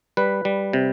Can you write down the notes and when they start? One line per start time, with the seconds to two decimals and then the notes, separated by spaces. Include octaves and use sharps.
0.17 G3 B4
0.45 G3
0.73 C3